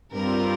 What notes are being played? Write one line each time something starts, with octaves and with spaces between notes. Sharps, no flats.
G2 G3 C4 F4 A#4